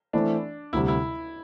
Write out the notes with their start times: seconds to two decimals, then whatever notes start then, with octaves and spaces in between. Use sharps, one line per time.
0.13 E3 A3 C4 D4 E4
0.73 D2 C3 G3 E4
0.88 E4